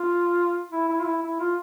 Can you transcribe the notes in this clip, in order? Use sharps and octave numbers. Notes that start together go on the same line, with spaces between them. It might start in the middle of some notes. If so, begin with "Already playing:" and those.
Already playing: F4
E4
E4
F4
E4
E4
F4